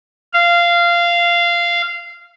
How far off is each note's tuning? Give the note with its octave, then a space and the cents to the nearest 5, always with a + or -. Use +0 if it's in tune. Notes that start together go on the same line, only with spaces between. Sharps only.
F5 -15